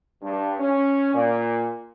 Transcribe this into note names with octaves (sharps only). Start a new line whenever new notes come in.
G2
C#4
A#2